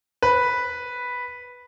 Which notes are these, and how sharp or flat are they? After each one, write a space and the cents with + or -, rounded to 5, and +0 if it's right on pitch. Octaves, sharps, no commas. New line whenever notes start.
B4 -5